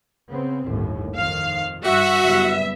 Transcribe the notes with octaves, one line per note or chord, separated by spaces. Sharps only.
C#3 B3 C4
G1 D#2 A2
F2 D#3 F5
G2 F#4 E5
F#1 G3 B3